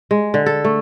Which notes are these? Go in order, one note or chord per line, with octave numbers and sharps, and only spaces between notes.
G#3
D3
A4
A3